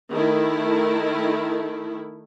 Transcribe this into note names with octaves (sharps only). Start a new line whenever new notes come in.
D#3 A3 E4